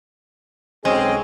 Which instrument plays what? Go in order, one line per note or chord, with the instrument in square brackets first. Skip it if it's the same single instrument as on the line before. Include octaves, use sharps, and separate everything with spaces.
[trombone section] B1 G#4 [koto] G#3 [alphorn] C4 [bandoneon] C#4 D#5